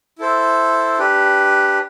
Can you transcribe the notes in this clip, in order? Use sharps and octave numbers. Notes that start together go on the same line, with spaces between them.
E4 A4 C5
D4 G4 B4